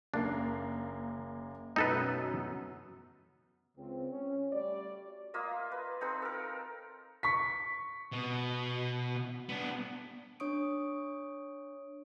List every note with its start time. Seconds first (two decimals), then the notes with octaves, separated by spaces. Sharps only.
0.14 F#1 A#3 D4 C7
1.76 F#2 B2 D#4 A4 B4
3.77 C#2 C4
4.11 C#4
4.53 G3 A3 F#4 D5
5.34 A#3 F4 D#5 E5
5.72 B4
6.01 C4 D#4 A4 B4
6.22 A4 A#4
7.23 C#6 B6
8.12 B2
9.49 B3 D4
10.40 D4 C#5 C#6 D#6 D7